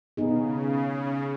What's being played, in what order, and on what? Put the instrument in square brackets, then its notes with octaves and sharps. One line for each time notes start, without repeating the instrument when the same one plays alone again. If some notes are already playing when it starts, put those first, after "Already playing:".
[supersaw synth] C#3 [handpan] B3 D#4 G#4